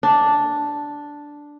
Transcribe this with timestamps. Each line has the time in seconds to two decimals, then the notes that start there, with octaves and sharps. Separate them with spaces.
0.03 D4